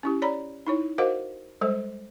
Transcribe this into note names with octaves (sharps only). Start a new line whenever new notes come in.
C#4 E4 G4
C#5 D5 A#5 B5
D#4 E4 C#5
F#4 A#4 C5 D#5 F5 F#5
G3 G#3 A4 C5